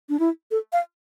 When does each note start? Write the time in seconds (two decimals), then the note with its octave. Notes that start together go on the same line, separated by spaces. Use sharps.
0.09 D4
0.20 E4
0.51 A4
0.73 F5